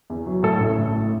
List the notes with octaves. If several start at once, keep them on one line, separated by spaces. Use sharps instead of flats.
E2
F#3
A2 A4
A1
A1
A2